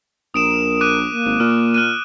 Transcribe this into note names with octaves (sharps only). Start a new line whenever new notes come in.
A#1 A#4 D#6 D7 E7
D6 F#6 D#7
A#3
G#1
A#2 F6
F6 F#6 D#7